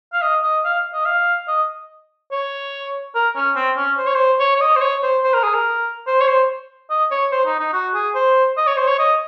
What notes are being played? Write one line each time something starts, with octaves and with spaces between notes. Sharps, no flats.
F5
D#5
D#5
F5
D#5
F5
D#5
C#5
A#4
C#4
C4
C#4
C5
C#5
C5
C#5
C#5
D#5
C5
C#5
C5
C5
A#4
G#4
A#4
C5
C#5
C5
D#5
C#5
C5
D#4
D#4
F#4
G#4
C5
D#5
C#5
C5
C#5
D#5